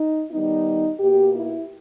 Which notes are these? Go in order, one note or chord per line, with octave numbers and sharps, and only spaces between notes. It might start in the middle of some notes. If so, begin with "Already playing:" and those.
Already playing: D#4
D#3 G3 B3 D#4
B2 A#3 G4
E4